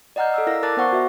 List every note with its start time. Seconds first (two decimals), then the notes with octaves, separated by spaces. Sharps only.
0.16 D5 D#5 F#5 A#5 F6 G6
0.34 A4 D5 E6
0.47 E4 A#4 F5 E6 A#6
0.63 A#4 D5 A5 D6 F#6 A6
0.77 B3 C5 F#5 C#6
0.92 F#4 E5